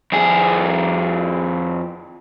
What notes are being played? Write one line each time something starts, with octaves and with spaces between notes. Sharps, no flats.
F2 G#4